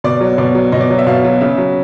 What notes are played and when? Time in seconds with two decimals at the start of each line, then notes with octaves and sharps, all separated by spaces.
0.04 B2 D5
0.21 F#3
0.38 B2 D5
0.55 F#3
0.72 B2 D#5
0.80 D5
0.90 F#3
0.98 E5
1.07 B2 F5
1.24 F#3
1.41 C#3 E5
1.58 F#3